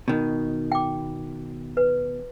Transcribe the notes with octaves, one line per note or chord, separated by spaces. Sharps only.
B2 D#3
G5 D6
B4